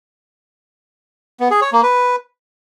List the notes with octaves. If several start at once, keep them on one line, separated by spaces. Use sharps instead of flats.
B3
G#4
C#5
A#3
B4